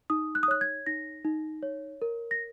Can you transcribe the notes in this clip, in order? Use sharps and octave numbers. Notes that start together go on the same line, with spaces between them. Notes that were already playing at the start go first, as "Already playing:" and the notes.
D#4 D#6
F#6
D#6
C#5 F#6
G#6
D#4 A#6
D#4
C#5
A#4
A#6